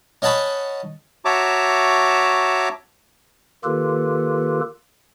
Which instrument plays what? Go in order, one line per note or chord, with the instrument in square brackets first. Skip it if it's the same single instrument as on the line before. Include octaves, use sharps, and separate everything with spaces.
[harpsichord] C#4 D#5 F#5 A5 B5 C#6
[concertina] F#4 C#5 E5 A5 A#5 D6
[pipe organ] D#3 A#3 F4 G4 A4 B4